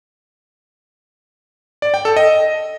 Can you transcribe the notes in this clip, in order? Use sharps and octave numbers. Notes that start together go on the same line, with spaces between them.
D5
G5
A4
D#5